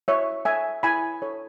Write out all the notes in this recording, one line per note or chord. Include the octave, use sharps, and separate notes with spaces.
E4 C#5 E5
A4 C#5 E5 G#5
E4 G#5 B5
A4 C#5